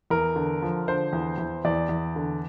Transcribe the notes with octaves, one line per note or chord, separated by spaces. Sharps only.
E2 A#4
D3
F3
D3 C5
E2
E2
E2 D5
E2
D3